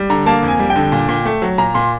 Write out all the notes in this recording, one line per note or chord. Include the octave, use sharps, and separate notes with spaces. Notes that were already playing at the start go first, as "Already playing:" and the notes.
Already playing: G3
D3 A#5
A#3 A5
F2
G#5
G3
G5
D3
A#2
A#2
A3
F#3
A#2 A#5
A#2 C6